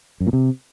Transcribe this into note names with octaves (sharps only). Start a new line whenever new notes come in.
F#2
A#2
C3